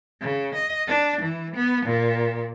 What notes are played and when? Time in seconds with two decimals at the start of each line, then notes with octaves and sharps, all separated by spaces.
0.21 C#3
0.55 D#5
0.88 D4
1.21 E3
1.56 B3
1.86 A#2